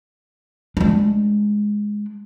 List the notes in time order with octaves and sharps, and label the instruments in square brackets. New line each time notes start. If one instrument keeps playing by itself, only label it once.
[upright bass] G#3 D4